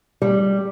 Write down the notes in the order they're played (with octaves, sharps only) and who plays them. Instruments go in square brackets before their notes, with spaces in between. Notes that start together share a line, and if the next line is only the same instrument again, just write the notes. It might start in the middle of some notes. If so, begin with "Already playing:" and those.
[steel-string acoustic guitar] G3